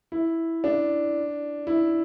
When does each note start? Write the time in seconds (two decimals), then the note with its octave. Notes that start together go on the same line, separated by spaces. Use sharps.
0.12 E4
0.64 D4
1.67 E4